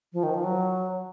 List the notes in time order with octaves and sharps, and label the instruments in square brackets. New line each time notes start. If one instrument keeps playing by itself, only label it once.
[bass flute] F3
D#3
F3
F#3